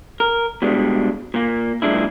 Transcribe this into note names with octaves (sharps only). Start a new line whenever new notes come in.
A#4
B2 G3 G#3 D4
A#2 A#3
F#2 A#2 G#3 D4 E4